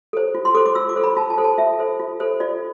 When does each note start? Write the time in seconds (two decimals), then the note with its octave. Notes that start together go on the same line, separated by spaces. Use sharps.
0.13 A4 C5
0.35 F4
0.45 C6
0.55 A4 C5 D6
0.66 D6
0.75 F4 E6
0.89 D6
0.96 A4 C5
1.04 B5
1.17 F4 A5
1.30 A5
1.38 A4 C5
1.44 A5
1.58 F4 E5
1.79 A4 C5
1.99 F4
2.20 A4 C5
2.40 F4 D5